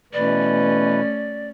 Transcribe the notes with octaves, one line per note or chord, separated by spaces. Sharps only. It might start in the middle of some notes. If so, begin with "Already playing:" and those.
B2 E3 A3 C#4 B4 D5